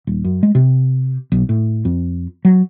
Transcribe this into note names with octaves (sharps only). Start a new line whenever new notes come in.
D#1
F#2
G#3
C3
B1
A2
F2
F#3